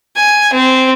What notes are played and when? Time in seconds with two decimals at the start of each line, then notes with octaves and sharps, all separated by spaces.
0.16 G#5
0.52 C4